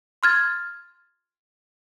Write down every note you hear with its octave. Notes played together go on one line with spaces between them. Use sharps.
C6 F6 G#6 A6